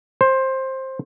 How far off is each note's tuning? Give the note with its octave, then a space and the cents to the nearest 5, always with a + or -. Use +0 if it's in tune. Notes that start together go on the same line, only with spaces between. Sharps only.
C5 +15